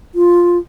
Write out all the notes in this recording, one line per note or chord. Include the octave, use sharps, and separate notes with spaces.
F4